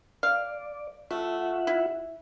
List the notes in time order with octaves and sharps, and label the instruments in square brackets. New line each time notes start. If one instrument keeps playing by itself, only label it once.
[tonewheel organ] D5 [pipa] F5
[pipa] A3 [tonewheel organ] F4 E5 F#5
[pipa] E4